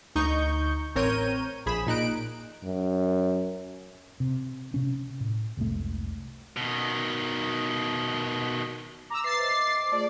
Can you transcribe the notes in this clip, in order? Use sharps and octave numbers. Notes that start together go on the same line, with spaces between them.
D2 D#4 C#6 G6
A1 C4 A#4 C#5 G6 D#7
A#1 G#4 B5 E7
A#2 D#4 F#6 D7
F#2
C3
C3 C#4
A2
F1 C2 G#2 A3
B2 D#3
A#5 D6 E6
B4 E5 D6 A6 C7
C5 D#5
A3 F4 G#4 D5